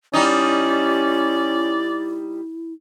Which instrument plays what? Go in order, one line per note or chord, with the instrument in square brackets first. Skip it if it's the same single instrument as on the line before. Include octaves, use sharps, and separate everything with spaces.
[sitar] G3 D#4 [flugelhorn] C#4 [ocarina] E4 [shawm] D5